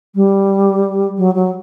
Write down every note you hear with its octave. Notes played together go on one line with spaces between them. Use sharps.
G3
F#3
F#3